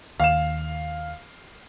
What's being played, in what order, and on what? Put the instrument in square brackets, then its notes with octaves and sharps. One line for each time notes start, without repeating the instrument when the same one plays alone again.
[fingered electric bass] D#2 [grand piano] F5 E7